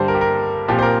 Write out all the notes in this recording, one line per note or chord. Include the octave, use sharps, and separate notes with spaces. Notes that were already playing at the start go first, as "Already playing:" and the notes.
Already playing: G2 D3 G3 G4 C5
A#4
G4
A#4
A#2 F3 C4 G4
C5
A#4